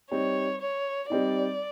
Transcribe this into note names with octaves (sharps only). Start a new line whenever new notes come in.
G3 C4 D#4 C#5
C#5
G3 C4 D#4 D5